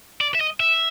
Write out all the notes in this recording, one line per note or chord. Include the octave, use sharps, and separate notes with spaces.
D5
E5
D#5
E5